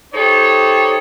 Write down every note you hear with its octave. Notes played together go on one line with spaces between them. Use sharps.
D#4 G4 A4 C5 C#5